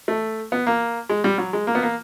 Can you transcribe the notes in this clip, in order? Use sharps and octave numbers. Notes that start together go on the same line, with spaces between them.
A3
B3
A#3
G#3
G3
F#3
G#3
A#3
B3
A#3